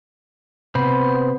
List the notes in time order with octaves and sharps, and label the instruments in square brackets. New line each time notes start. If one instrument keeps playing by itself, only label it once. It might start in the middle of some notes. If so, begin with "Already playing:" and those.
[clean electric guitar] C3 [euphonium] B3 [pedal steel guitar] C5 B5